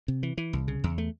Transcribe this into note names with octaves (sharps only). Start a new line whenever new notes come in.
C3
E3
E3
C2
C#3
E2
A3